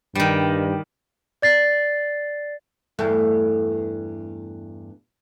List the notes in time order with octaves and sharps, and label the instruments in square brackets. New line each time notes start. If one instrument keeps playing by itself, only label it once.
[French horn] G2 [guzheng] D#3 G3
[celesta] D5 A6 C7
[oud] E2 G2 A3